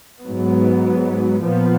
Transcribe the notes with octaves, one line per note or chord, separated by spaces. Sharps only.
G#2 F#3 B3
A#2 F3 B3